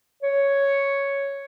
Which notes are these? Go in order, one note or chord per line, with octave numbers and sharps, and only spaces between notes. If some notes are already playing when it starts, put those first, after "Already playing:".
C#5